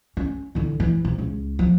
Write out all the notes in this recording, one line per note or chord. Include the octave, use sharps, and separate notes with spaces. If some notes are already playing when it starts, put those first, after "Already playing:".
C#4
D3 E3
E3
C3
C#2
F3